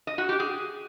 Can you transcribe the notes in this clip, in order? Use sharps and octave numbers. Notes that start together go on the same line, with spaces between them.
D#5
F#4
G4
G#4